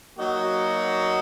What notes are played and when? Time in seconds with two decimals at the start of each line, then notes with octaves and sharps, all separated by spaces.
0.18 F#3 A#3 D#4 F#4